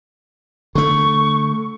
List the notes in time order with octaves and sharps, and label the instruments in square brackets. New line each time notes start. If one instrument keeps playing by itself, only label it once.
[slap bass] D3 A3 [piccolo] C#6